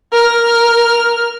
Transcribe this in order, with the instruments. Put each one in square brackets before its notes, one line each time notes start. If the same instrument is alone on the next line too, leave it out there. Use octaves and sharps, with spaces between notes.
[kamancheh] A#4 F6